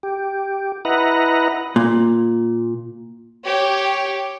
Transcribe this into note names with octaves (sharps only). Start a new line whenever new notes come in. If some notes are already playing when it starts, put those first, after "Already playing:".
G4
E4 B4 D#5 F#5 A#5
A#2
G4 C#5